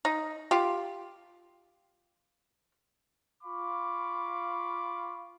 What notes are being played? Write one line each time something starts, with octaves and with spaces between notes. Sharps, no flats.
D#4
F4 G4
F4 F5 B5 C#6 D6